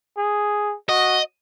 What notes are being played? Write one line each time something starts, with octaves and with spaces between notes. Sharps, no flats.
G#4
F#4 D#5